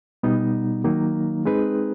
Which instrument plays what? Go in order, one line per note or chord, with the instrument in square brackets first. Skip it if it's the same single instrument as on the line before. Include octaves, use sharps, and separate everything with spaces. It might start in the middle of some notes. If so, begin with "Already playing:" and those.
[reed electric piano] B2 G3 B3 D#4
D#3 F#3 A#3 D#4
G#3 C4 D#4 G#4 B4